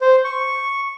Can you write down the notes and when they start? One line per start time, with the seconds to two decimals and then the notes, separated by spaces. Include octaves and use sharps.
0.01 C5
0.24 C#6